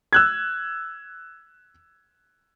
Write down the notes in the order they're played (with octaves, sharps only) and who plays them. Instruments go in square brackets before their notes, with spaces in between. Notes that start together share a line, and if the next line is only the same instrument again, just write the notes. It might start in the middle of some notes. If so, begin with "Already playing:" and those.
[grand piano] E6 F#6 G#6